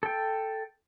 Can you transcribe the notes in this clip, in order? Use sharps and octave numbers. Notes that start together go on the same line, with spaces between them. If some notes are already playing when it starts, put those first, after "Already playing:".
A4 G5